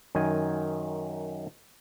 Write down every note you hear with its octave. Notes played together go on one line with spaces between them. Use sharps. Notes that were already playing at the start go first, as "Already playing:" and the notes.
F#2 D#3 G#5